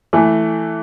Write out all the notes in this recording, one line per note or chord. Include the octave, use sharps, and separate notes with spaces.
E3 A3